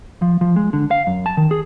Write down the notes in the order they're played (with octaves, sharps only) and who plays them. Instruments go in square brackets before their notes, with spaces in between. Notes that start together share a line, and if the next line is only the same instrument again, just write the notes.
[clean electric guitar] F3
F3
G#3
D3
F5
F#2
A5
D#3
G#4